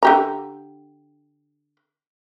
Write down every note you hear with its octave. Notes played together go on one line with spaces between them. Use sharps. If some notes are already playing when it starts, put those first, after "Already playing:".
D3 G4 A#5